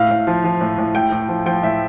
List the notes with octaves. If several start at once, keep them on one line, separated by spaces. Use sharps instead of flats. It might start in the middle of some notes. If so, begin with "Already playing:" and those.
Already playing: A2 F5
A2
F3
F3
A2
A2
A2 G5
A2
F3
F3 G5
A2 E5